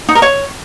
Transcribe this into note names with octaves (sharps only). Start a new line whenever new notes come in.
D#4
A#4
C#5